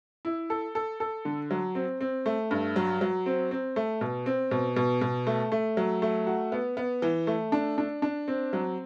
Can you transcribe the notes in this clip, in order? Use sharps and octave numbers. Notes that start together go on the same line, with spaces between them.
E4
A4
A4
A4
D3
F#3
C4
C4
A3
G2
F#3
F#3
C4
C4
A3
B2
C4
B2
B2
B2
A3
A3
F#3
A3
F#4
B3
B3
E3
A3
D4
D4
D4
C4
F#3